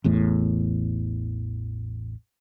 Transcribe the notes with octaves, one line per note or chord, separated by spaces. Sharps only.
A1 E2 A2